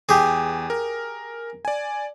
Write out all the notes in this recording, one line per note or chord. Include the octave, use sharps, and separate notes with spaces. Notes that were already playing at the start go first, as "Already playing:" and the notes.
E2 G4 G#4
A#4
D5 G#5